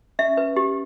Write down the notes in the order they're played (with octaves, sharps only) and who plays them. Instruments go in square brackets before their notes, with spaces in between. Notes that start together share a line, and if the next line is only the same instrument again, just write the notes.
[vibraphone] C#4 [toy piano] E5
[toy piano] B4
G4